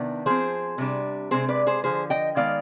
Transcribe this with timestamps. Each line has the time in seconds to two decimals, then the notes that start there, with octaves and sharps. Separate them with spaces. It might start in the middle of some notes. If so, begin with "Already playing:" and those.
Already playing: C3 D#3 B3 D4
0.26 F3 C4 G#4 C5
0.78 C3 G3 D4
1.31 C3 D#3 G#3 C4 G#4 C5
1.49 B4 D5
1.67 G#4 C5
1.84 D3 F3 B3 G#4 C5
2.10 D#5 G5
2.36 D#3 G#3 B3 D5 F5